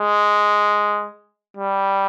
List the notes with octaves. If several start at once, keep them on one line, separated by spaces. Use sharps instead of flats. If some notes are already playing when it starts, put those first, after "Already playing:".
Already playing: G#3
G3